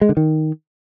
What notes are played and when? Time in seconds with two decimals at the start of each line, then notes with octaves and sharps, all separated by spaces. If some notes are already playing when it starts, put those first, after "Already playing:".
0.01 G#3
0.09 D3
0.17 D#3